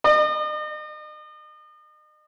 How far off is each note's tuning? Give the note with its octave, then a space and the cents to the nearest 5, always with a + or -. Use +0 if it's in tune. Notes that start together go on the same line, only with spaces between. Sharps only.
D#5 -40